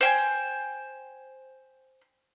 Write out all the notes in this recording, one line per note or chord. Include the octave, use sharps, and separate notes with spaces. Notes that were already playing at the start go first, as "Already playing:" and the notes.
C5 G5 G#5